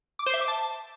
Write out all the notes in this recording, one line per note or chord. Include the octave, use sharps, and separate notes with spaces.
D6
C5
E5
D6
A5